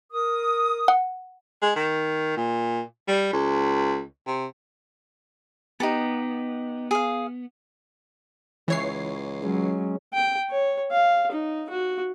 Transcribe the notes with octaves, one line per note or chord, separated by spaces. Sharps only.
A#4 D#6
F#5
G#3
D#3
A#2
G3
C#2
C3
B3 D#4 G4 A4
G#4 F5
C#2 E3 C#5 C7
F#3 G#3 C#4
G5
C#5
F5
D#4
F#4